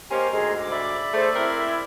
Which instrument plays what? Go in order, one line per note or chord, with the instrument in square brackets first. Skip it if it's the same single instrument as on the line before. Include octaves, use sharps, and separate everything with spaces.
[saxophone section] A#3 C#4 [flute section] G4 C5 D#5 [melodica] A#5 C6
[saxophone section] D2 G#2 [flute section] G#4 D#5
[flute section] D6
[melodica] D5 E5 B5
[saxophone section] A3 [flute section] G#4 C5
[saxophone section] C4 A#4 [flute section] E4